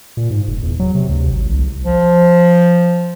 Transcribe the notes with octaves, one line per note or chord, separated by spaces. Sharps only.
A#2
G#2
F1
E2
F#3
C3
D2
G#1
C2
F3